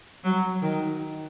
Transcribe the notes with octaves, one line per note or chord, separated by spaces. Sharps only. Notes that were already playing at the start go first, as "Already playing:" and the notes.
F#3
D#3